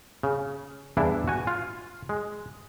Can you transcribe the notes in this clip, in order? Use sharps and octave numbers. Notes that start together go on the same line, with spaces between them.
C#3
E2 G2 D4 E4
F#4 G#5
F4
G#3